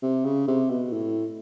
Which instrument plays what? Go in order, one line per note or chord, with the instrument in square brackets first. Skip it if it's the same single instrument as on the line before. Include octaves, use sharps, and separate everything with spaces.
[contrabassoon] C3
C#3
C3
B2
A2